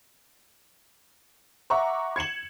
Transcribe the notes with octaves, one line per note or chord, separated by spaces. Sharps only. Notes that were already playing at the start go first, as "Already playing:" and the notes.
E5 F#5 A#5 C#6 D6
G#6 C#7 E7 F#7